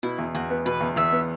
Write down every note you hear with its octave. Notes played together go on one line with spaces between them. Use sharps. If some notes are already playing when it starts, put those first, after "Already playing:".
B2 E4
E2
E2 F#4
B3
B2 B4
E2
E2 E5
B3